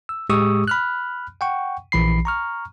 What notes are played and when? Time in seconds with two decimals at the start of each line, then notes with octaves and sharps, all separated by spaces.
0.09 E6
0.29 A2 G#3 G4 C#6 D#6 E6
0.68 B5 F6 F#6
1.41 F#5 G5 C#6
1.92 A#1 E3 B5 C7
2.25 A#5 C#6 F6